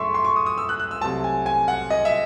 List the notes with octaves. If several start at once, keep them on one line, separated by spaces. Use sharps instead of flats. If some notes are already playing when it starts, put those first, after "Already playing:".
Already playing: F#2 C#3 F#3 A3 E5 C6 C#6
C6
C#6
D#6
D#6
E6
F#6
F#6
E6
C2 C3 F#3 A3 A5
G#5
G#5
F#5
D#5
E5